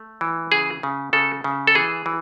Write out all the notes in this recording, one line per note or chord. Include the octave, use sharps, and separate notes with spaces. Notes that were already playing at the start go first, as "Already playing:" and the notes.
Already playing: A3
E3
C#3 G#4
C#3
C#3 A4
C#3
A4
E3 G#4
E3